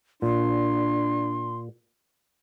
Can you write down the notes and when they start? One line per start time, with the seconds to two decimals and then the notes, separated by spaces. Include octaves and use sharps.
0.22 A#2 D4 C6